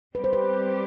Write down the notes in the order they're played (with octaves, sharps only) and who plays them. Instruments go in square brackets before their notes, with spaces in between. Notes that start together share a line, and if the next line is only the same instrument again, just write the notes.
[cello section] G3 C4 G4 [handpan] B4
[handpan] C5
B4